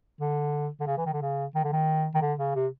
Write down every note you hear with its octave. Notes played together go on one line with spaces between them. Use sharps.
D3
D3
C#3
E3
D#3
D3
C#3
D#3
D3
D#3
D#3
D3
C#3
C3